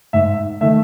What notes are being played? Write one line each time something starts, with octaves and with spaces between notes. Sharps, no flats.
G#2 E5
D#3 A3 E5